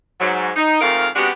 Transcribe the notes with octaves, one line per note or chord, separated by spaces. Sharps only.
G#2 F#3
D#4
F2 G#2 A3 A#4 F5
C3 G#3 B3 D4 F#4 G4